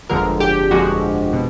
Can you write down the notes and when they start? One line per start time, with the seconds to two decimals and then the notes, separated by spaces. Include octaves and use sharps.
0.10 G1 F2 D3 F3 G#3 A#4
0.40 G4
0.71 G1 F2 D3 F3 G#3 F#4
1.33 B2